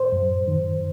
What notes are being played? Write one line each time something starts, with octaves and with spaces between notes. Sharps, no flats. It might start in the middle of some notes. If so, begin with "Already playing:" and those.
Already playing: C5
F#2
D#3